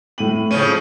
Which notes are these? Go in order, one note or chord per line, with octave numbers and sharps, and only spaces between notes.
A2 D#7 F#7
C#3 F3 C#4 D#7